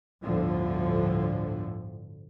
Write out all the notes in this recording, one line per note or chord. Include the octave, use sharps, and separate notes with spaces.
G1 D2 A2 D3 F3